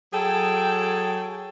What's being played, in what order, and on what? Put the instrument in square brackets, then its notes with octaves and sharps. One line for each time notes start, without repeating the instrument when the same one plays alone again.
[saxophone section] F#3 G#4 A4 [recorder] G5